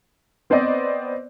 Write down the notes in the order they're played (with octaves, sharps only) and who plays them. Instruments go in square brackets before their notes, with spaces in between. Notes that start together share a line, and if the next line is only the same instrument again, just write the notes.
[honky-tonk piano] B3 C4 C5 D5 D#5